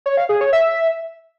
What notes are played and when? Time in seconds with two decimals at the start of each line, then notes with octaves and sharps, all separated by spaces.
0.06 C#5
0.17 F5
0.29 G#4
0.41 C#5
0.53 E5